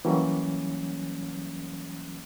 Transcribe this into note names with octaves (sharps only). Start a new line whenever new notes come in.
E3 F#3 G3 A#3 C#4